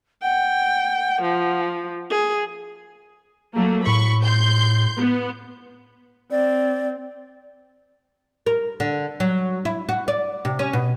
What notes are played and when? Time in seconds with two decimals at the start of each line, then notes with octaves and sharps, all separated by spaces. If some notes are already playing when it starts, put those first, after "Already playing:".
0.22 F#5 G5
1.22 F3
2.10 G#4
3.55 F#3 A3 A#3
3.87 A2 B5 C#6
4.25 C6 G6
4.97 B3
6.31 C4 D5
8.46 A#4
8.80 D3
9.20 F#3
9.65 E4
9.89 F#4
10.08 D5
10.45 C3
10.59 C#4
10.73 B2